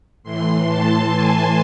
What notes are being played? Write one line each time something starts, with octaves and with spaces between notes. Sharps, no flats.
A2 E3 C6
A5
G#5